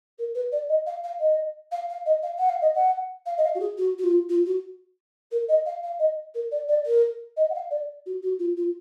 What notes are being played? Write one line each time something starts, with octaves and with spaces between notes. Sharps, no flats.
A#4
B4
D5
D#5
F5
F5
D#5
F5
F5
D#5
F5
F#5
F5
D#5
F#5
F5
D#5
F5
F#4
G#4
F#4
F#4
F4
F4
F#4
A#4
D#5
F5
F5
D#5
A#4
D5
D5
A#4
D#5
F#5
F5
D5
F#4
F#4
F4
F4